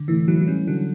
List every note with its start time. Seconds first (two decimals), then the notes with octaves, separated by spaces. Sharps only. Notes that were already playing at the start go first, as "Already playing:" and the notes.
Already playing: D3
0.08 A2 E3
0.28 E3 F#3
0.41 F#3
0.48 G3 C#4
0.67 D3 F#3